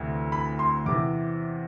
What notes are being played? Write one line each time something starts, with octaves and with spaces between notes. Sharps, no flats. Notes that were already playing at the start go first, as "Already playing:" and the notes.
Already playing: D2 C3 E3
B5
C6
E2 C3 E3 D6